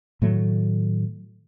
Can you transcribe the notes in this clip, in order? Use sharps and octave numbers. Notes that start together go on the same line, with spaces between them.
A2 D#3 F#3 A3